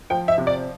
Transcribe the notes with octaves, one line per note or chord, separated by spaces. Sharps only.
F3 G5
E5
C3
D5